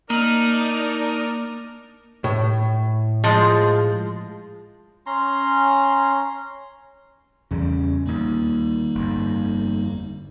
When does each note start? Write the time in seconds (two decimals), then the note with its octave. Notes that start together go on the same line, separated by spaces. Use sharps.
0.10 A#3 D4 D#4 A#4 D#7 F#7
2.24 A2
3.24 F3 G#3
5.06 C#4 A#5 C6
7.51 E2 C#3 G3 C#4
8.06 D#2 A#2 G3 A#3 D#4
8.95 G1 F2